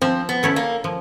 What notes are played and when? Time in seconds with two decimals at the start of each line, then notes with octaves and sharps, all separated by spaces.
0.02 F3 C4
0.29 B3
0.43 A3 C#4 E4
0.56 A#3
0.84 F3